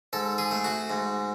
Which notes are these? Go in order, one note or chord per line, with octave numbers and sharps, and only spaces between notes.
G#2 A4
G#4
A3
F#4
G#2